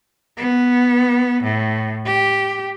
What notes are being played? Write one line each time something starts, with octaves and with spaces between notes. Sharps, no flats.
B3
A2
G4